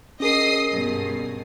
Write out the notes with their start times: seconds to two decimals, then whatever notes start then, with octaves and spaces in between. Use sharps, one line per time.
0.20 C#4 G#4 A#4 D#5 D#6 C7
0.69 G2 B2